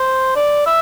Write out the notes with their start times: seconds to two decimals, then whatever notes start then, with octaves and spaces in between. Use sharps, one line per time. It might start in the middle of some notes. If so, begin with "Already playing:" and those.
Already playing: C5
0.36 D5
0.66 E5